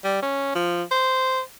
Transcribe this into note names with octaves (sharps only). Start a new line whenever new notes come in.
G3
C#4
F3
C5